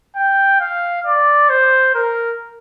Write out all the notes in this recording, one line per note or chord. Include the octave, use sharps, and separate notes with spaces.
G5
F5
D5
C5
A#4